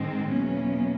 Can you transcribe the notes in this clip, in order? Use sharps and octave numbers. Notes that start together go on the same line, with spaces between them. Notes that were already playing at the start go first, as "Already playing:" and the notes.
Already playing: G#2 D#3 G#3 C4
E2 B2 F#3 A#3 C#4